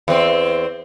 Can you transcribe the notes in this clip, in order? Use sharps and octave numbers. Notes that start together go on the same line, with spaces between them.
E2 C4